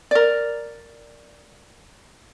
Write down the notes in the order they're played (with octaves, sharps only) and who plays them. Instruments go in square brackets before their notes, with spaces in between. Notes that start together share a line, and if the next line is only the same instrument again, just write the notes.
[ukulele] A#4 D5